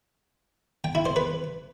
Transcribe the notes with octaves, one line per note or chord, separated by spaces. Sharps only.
G5
E4
C5
B4